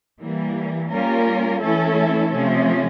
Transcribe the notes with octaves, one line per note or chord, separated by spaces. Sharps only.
E3 G3 A#3
G3 A#3 C#4 F4 A#4
E3 A3 C#4 E4 A4
C3 F3 A3 C#4